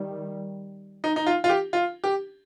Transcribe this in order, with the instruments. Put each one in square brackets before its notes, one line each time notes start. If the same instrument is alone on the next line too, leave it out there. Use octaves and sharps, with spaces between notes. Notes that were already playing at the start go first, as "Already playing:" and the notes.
Already playing: [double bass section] D#3 G3
[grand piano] D#4
D#4
F4
F4
G4
F4
G4